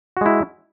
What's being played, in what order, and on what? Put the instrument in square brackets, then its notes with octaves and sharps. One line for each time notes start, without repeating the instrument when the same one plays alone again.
[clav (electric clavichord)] F#4
G#3
E4